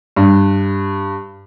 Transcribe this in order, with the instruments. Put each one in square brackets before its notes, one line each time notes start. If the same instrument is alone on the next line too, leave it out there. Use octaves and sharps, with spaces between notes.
[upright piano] G2